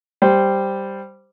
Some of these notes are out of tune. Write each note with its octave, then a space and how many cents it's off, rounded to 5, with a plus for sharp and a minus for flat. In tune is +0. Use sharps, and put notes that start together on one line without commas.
G3 +0 C5 +0